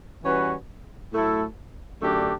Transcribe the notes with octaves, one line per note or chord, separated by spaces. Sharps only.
E3 G3 C#4 F#4 B4
A2 F#3 A3 E4 A4
F#2 D3 A3 D4 G4